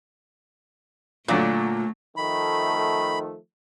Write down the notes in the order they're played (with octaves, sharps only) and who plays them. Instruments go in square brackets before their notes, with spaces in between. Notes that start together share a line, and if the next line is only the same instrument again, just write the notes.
[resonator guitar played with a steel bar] A#2 [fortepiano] D3 F#3 D4 [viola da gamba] A3
[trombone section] D#3 F3 A3 [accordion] B5